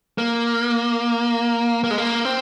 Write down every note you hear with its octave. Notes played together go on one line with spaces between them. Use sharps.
A#3
A#3
G#3
A#3
C4